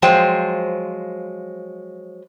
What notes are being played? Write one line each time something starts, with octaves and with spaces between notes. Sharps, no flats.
F3 F#3 G#3 F4 C5 G5